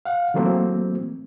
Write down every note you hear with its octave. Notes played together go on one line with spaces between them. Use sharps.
F5 F#5
E3 F#3 A3 A#3 C4